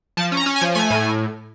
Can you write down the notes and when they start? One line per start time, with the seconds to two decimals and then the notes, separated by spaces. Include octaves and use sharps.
0.17 F3 A5
0.32 C#4
0.37 A#5
0.46 C#4
0.56 G#5
0.61 F3
0.75 A3 G#5
0.90 A2